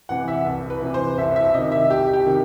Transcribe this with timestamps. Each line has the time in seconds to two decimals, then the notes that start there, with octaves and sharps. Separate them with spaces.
0.09 C3 E3 F#5
0.28 E5
0.46 C2
0.70 B4
0.82 C3 E3
0.94 C5
1.18 C2 E5
1.36 E5
1.54 C3 D#3 D#5
1.72 E5
1.90 C2 G4
2.13 G4
2.26 C3 D#3